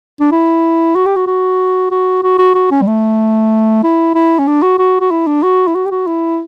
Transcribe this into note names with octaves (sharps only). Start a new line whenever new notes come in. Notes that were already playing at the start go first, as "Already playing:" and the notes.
D4
E4
F#4
G4
F#4
F#4
F#4
F#4
F#4
F#4
C#4
G3
A3
E4
E4
C#4
D4
F#4
F#4
F#4
E4
D4
F#4
E4
F#4
G4
F#4
E4